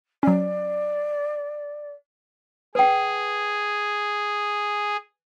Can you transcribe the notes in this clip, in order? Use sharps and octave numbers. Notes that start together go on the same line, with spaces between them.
F#3 C#4 D5
G#4 B4 G5